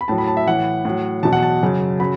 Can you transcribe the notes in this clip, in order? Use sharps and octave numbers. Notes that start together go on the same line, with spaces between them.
B5
A2 F#3 A5
B5
A5
E5
A2 E3 F#5
A2 F#3
E2 B2 F#3 A5
F#5
A5
F#2 C#3 F#3
C#3 F#3 B5